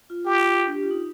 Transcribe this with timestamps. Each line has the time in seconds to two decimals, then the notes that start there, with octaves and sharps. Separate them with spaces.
0.10 F4
0.26 F4 G4
0.67 D4
0.74 G4
0.83 F4
0.91 D#4